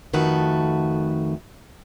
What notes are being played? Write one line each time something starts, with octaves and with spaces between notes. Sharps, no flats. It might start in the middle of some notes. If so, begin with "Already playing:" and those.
F2 D#3 A3 F#4 B4